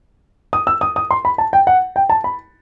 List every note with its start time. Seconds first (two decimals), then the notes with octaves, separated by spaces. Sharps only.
0.53 D#6
0.67 E6
0.81 D#6
0.96 D#6
1.11 C6
1.25 B5
1.38 A5
1.53 G5
1.67 F#5
1.96 G5
2.10 A5
2.24 B5